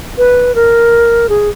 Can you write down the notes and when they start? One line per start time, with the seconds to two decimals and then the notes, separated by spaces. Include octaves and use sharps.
0.18 B4
0.55 A#4
1.29 G#4